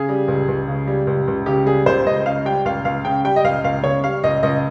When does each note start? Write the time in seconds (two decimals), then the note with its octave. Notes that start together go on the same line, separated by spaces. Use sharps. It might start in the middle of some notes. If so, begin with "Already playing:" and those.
Already playing: C#3 G#4
0.09 G3
0.28 C#2
0.48 C#2
0.68 C#3
0.87 G3
1.07 C#2
1.28 C#2
1.46 C#3 G4
1.66 G3 G#4
1.86 C#2 C5
2.06 C#2 D#5
2.26 C#3 F5
2.45 G3 G5
2.65 C#2 F5
2.85 C#2 F5
3.05 C#3 G5
3.25 G3 G5
3.36 D#5
3.44 C#2 F5
3.64 C#2 F5
3.84 C#3 C#5
4.04 G3 F5
4.23 C#2 D#5
4.43 C#2 D#5